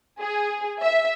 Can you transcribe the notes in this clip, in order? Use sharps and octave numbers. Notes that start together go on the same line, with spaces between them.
G#4
E5